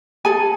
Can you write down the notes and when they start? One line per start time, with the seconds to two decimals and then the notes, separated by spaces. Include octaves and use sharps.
0.25 G#4 A4 G#5